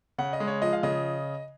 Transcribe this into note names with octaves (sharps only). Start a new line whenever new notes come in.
C#3 F#5
D#5
G#3
C#5
F3 D#5
F5
C#3 D#5